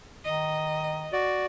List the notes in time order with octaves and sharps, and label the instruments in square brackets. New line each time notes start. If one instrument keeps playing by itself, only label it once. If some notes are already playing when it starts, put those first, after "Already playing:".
[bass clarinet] D#3 [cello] D#5
[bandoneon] F#4 D5